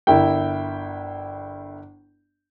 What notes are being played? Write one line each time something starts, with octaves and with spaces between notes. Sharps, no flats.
G1 E4 A#4 G5